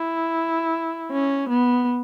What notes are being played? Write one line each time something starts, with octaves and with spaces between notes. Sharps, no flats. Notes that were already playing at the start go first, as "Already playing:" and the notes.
Already playing: E4
C#4
B3